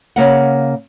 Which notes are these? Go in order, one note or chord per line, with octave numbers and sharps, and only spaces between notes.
C#3 F3 A#3 F#5